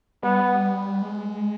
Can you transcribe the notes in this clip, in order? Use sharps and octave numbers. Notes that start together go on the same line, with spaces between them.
G3 B3
G#3